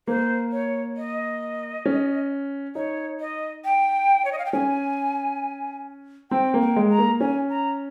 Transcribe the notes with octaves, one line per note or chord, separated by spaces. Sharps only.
A#3 C5
C#5
D#5
C#4
D#4 C#5
D#5
G5
C#5
D#5
F5
G5
C#4 G#5
C4 G5
A#3
G5
G#3
A#5
A#3
C#4 G#5
A#5